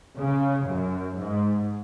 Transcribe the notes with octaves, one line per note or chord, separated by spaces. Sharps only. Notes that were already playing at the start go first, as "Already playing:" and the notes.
C#3
F#2
G#2